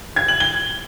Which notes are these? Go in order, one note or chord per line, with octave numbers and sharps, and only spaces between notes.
G#6
F#7
G7